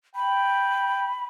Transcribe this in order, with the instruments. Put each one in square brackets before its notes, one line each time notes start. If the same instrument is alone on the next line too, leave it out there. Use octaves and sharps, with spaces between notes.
[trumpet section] G5 [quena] B5